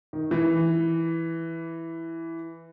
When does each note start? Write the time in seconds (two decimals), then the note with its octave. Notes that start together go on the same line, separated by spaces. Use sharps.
0.13 D#3
0.31 E3